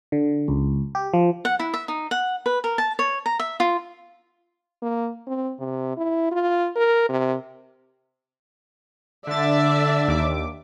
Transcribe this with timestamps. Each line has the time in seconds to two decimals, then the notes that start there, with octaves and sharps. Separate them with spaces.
0.12 D3
0.48 C#2
0.95 G4
1.13 F3
1.45 F#5
1.60 E4
1.74 E5
1.88 D#4
2.11 F#5
2.46 B4
2.64 A#4
2.78 A5
2.99 C#5
3.26 A#5
3.40 E5
3.60 F4
4.83 A#3
5.27 C4
5.59 C3
5.97 E4
6.32 F4
6.76 A#4
7.09 C3
9.27 D3 D4 D5 E5 A6
10.08 D#2 D6